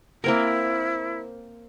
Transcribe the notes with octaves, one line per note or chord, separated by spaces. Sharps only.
A#3 C4 E4 A#4